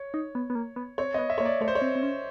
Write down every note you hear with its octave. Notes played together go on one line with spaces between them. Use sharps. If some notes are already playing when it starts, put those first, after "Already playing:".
Already playing: C#5
D#4
B3
B3
A#3
B3
C4 C#5
B3 C4 D#5
E5
C#5
A#3
D5
A3 C#5
C5
C#5
C4
C4
C#4